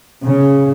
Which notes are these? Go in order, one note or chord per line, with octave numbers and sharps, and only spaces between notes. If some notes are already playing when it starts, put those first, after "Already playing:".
C#3